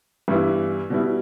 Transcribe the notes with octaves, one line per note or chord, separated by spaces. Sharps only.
G2 E3 G3 B3 E4
B2 G3 B3 E4